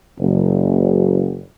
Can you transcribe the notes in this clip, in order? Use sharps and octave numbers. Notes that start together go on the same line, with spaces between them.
F#1